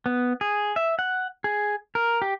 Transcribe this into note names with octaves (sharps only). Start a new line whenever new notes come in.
B3
G#4
E5
F#5
G#4
A#4
G4